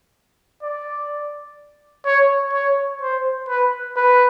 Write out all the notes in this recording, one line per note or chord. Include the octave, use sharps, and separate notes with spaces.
D5
C#5
C#5
C5
B4
B4